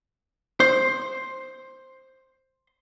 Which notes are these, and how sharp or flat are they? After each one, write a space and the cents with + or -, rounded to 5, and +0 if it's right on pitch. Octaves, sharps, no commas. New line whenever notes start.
C5 +5